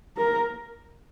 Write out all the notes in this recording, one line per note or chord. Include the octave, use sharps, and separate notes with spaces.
A#4